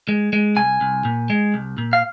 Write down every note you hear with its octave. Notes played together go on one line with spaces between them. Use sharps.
G#3
G#3
C2 G#5
C2
A#2
G#3
C2
A#2
F5